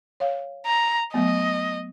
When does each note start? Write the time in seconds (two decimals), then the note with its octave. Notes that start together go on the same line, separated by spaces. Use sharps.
0.20 C#5 F5
0.66 A#5
1.14 F#3 A3 B3 D#5